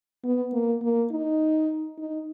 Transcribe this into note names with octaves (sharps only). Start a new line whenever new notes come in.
B3
A#3
A#3
D#4
D#4